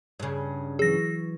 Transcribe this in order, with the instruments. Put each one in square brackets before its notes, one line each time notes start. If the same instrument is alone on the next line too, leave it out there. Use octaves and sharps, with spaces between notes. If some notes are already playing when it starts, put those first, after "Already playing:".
[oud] G2 C#3
[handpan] E3 F#3 C#5 [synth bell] G#4 A#6